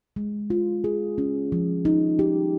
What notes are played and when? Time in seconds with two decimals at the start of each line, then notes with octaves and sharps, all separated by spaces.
0.16 G#3
0.50 F4
0.84 G#4
1.18 C#4
1.52 F3
1.85 D#4
2.19 G4